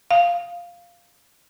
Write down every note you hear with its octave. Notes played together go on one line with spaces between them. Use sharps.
F5